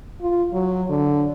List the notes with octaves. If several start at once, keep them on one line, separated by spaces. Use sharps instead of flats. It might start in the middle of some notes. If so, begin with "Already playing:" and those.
F4
F#3
D3